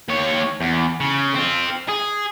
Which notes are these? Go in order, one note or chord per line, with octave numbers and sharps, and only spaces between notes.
D#2 C#5
E2
C#3
C4 F4
G#4